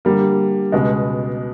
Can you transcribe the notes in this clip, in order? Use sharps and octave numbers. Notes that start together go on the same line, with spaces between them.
D3 G3 A#3
C#2 B2 G#3